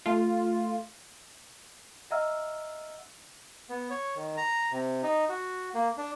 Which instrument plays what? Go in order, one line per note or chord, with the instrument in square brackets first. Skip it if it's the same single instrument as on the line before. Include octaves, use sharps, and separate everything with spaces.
[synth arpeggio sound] A3 F4
[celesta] D#5 E5 F#5 A#5 E6 F6
[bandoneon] B3
C#5
D#3
A#5
C3
D#4
F#4
A#3
D4